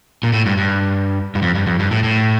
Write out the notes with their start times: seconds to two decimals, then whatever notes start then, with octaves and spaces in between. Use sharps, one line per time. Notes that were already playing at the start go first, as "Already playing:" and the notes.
0.23 A#2
0.33 A2
0.46 G2
0.57 G2
1.35 G2
1.42 F2
1.55 G2
1.67 F2
1.79 G2
1.91 A2
2.04 A2